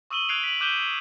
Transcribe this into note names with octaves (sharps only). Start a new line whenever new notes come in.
C#6 D#6 E6 D#7 F#7 G7
F#6 G#6 C7 D7 F7
B6 D7 F#7
D6 F#6 G6 D#7 E7 G7
F#7